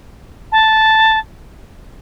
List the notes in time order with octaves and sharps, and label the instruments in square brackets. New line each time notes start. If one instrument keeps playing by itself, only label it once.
[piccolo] A5